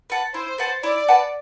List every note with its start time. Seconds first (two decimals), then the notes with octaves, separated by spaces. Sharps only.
0.10 B4 F#5 A5
0.34 E4 C5
0.58 B4 F#5 A5
0.83 E4 D5
1.08 B4 F#5 A5